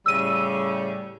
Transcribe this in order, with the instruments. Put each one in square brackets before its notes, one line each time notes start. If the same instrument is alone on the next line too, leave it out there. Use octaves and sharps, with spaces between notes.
[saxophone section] A2 C#3 G3 [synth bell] E6 D#7